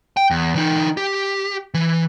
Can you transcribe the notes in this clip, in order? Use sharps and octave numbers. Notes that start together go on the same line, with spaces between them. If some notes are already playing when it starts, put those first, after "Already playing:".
G5
E2
E3 D#4
G4
E3